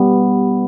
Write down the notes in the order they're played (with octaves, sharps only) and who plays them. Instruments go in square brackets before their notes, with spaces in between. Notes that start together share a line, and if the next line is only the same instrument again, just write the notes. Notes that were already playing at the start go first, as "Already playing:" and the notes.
Already playing: [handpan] G3 B3